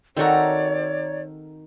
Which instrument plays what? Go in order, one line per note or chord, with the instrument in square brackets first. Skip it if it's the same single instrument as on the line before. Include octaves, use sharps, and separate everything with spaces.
[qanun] D#3 A4 A#5 [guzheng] C4 F#4 [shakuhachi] C#5 [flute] D5